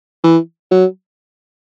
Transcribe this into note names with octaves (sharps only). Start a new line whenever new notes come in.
E3
F#3